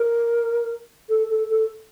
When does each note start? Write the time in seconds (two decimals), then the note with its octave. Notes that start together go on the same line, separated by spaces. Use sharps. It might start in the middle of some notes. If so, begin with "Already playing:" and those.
Already playing: A#4
1.09 A4
1.29 A4
1.49 A4